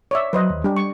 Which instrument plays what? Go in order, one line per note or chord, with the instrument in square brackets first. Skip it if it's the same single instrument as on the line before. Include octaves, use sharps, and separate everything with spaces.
[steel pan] C#5 D5 E5
[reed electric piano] F#3 [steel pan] B4 C5 D#5
[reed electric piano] D#2
[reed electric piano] G3 [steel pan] D4 G4
[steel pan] C#6